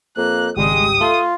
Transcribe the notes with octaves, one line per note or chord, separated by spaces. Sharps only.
F2 A#3 F#6
G#1 C#2 G3 G#3 G4 D#6
A3 F4 C6